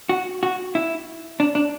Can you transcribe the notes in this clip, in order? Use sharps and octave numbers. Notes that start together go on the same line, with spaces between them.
F#4
F#4
E4
D4
D4